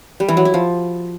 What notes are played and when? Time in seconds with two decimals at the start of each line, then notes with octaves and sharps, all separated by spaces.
0.20 G3
0.28 E3
0.37 F#3
0.45 E4
0.54 F3